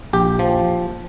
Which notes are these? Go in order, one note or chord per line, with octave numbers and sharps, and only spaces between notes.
A#1 G4
F3